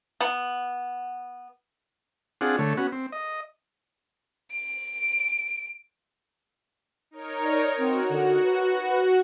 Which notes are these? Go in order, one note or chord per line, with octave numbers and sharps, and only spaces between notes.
B3
C4 D4 F4 G#4 F#5
D3 A3 C#5
B3 C#4 F#4
C4
D#5
D7
D#4 A#4 C#5
D5
C4 F#4
D3
B4